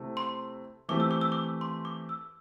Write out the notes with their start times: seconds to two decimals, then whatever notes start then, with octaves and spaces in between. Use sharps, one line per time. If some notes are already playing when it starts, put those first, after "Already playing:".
Already playing: C3 A3 C4 E4
0.17 C6
0.88 E3 A3 C4 G4 D6
1.00 E6
1.11 D6
1.21 E6
1.32 D6
1.61 C6
1.85 D6
2.09 E6